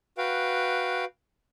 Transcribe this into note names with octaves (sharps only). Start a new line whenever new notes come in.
F#4 B4 F5 G5